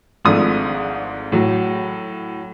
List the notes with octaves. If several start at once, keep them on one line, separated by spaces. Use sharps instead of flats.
G#1 G#2 F3 A3 D4 D#6
A2 F#3